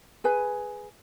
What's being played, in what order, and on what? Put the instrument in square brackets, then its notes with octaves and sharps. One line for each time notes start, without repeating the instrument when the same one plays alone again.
[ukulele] G#4 B4 G#5